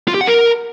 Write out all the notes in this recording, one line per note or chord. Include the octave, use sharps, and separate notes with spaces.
F4
G4
F#5
A#4